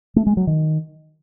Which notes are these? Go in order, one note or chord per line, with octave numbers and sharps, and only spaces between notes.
A3
G#3
F#3
D#3